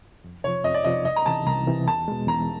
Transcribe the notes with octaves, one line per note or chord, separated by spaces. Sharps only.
F2
C3 F3 C#5
F2 D#5
D5
C3 F3 D#5
C2 D#5
A#5
C3 E3 A5
C2 A#5
C3 E3
E2 A5
B2 G#3
E2 A#5